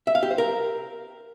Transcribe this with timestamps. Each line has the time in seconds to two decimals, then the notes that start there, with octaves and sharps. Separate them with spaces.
0.07 E5
0.15 F5
0.23 G4
0.30 C5
0.38 A#4